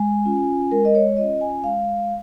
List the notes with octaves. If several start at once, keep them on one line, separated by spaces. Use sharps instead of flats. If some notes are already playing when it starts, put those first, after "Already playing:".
Already playing: G#3 G#5
C#4 F4
G#3 A#4
D#5
C#5
C#4 F4 D#5
G#5
G#3 F5